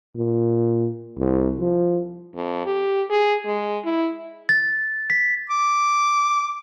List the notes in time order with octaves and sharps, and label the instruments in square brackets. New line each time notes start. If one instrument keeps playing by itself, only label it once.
[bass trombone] A#2
C2
F3
[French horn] F2
G4
G#4
G#3
E4
[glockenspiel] A6
B6
[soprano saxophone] D6